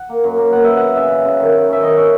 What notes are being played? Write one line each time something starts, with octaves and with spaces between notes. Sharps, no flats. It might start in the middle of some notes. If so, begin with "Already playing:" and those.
Already playing: F#5
A#3
F#2
A#3
B3 F#5
B3 E5
B3 F#5
C#3 E5
C#3
C#3
D#3
D#3
C#4 E5
D#3 D#5
C#4 E5